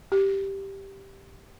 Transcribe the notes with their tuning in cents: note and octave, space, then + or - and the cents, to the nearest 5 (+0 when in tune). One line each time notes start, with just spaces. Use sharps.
G4 -5